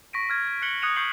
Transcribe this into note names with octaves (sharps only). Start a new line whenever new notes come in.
C#6 A#6 B6 D7 D#7
F6 G#6 A#6
G#6
F#6 B6 C#7 F#7 G7
D#6 F#6 G#6 C#7 D#7 F7
C#6 G6 C7 C#7 F#7 G7